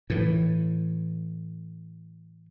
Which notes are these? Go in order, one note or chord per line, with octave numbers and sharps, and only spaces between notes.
A2 E3